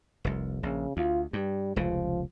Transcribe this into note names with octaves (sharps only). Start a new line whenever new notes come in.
F1 C2
A#1 C#3
D2 F4
G2 G3
F1 C#2 C#3 F3